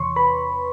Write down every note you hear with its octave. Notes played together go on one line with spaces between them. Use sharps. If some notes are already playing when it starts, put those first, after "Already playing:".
Already playing: E2 C3 E3 C#5 C6 C#6
B4 B5